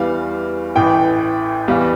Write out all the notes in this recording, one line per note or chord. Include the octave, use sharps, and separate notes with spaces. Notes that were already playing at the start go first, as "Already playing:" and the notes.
Already playing: E2 E3 G3 F5
A1 A2 E3 G5
E2 E3 G3 F5